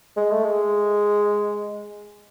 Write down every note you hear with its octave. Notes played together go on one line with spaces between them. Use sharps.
G#3
A3
G#3